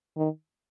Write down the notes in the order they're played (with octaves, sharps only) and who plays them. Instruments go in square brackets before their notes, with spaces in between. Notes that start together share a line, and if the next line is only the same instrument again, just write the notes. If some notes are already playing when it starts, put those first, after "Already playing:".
[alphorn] D#3